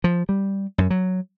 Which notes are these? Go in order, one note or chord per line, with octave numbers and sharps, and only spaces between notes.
F3
G3
F#2
F#3